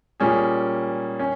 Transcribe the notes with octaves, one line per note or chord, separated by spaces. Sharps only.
A#2 G3 C#4 G#4
C#4